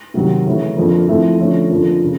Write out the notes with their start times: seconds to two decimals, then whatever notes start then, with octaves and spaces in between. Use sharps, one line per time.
0.14 C3 D#3 F#3
0.46 C#3 E3 A3 C#4 E4
0.76 F2 D3 F3 A#3
1.08 F3 A3 C4 E4
1.39 D3 F3 A3 C#4
1.70 F2 D3 F3 A#3
2.01 C#3